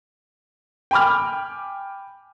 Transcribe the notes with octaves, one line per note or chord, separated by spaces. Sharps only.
G5 G#5 B5 D6 F6